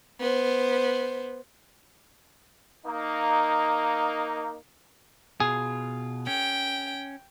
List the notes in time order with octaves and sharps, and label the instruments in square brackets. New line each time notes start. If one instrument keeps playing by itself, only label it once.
[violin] B3 C5
[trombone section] A#3 D#4
[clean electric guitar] B2 F4 [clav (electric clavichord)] G#4
[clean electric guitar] C#4 [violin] G5